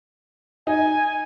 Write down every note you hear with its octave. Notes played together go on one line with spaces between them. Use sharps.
D#4 G#5